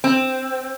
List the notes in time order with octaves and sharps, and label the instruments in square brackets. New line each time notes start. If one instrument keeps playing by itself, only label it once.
[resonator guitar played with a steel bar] C4